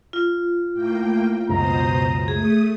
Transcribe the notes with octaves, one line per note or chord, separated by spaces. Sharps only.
F4
A2 A#3 G5
C#2 F#2 B2 C5 A#5 D#6
A3 G#4 D#6